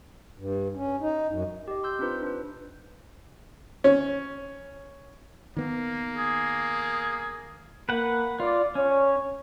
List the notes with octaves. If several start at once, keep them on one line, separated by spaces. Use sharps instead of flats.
G2
C#4
D#4
F#2
G4 D#5
C6 E6 G6
C4 D4 D#4 F4 B4 C5
D4 B4
C#4
D#3 A#3 B3
G#4
A#3 B4 F#5
F4 D5
C#4 C#5